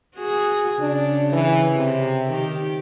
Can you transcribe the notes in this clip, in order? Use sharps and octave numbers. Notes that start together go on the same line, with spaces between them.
F#4 G#4
C#3 D4
E3
C3
D#3 G4